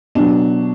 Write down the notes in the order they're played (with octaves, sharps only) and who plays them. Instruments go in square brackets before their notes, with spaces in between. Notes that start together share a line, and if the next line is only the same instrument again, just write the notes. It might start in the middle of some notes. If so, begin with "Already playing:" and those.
[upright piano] B2 F#3 D4